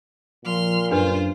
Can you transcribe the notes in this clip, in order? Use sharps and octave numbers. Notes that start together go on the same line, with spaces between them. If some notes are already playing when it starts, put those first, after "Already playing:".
A#2 F3 C6 F6
F#2 D4 F4 G4 B4 C5